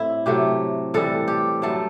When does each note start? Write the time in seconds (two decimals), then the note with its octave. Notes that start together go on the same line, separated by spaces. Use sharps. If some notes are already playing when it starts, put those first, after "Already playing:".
Already playing: A2 C3 G3 C4 E4
0.26 C3 F#3 A3 G4
0.94 A2 E3 G3 A4
1.28 G4
1.62 G2 F#3 A3 A4